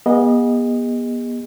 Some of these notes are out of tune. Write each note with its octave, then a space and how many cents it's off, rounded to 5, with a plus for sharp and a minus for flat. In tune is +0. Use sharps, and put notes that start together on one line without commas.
B3 -35 G#4 -45 D#5 +0